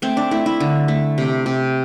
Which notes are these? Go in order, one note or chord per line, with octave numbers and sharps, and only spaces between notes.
A3 C4
D4
A3 E4
E4
D3
A3
C3
C3